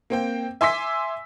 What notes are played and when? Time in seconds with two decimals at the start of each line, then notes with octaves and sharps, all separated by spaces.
0.10 A#3 C4 G5
0.61 E5 G#5 C6 D6 E6 B6